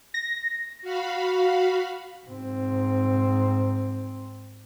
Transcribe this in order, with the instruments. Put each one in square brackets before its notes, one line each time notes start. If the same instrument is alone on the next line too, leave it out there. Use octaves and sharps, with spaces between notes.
[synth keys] A#6
[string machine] F#4 F5 B5
[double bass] G#2 C4